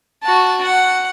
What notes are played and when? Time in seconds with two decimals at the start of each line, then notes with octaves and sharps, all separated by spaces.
0.23 F#4 A5
0.63 F#5